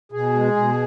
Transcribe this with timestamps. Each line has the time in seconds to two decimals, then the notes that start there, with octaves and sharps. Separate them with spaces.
0.12 B2 G#4
0.34 G#3
0.56 B2